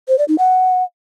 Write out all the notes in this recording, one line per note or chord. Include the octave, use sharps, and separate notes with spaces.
C5
D5
D#4
F#5